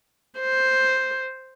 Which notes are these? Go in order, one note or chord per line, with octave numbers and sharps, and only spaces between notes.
C5